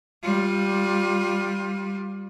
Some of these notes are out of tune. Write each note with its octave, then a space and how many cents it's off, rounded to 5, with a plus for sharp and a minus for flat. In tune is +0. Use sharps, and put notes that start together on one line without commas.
G3 +0 F4 +20